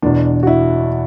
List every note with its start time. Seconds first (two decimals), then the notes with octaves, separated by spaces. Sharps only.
0.02 E2 B2 D4
0.43 F#4
0.47 E4